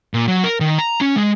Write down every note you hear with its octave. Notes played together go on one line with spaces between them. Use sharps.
A#2
F#3
A#4
D#3
A#5
C#4
G#3